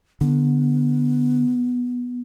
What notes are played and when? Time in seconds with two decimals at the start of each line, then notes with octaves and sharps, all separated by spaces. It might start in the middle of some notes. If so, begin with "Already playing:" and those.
0.21 D3 B3